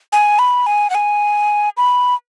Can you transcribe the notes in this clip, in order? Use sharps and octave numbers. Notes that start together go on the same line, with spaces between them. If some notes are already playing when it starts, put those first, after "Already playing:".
G#5
B5
G#5
F#5
G#5
B5